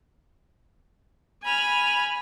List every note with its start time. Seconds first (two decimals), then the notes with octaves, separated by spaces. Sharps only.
1.44 G#5 B5 F6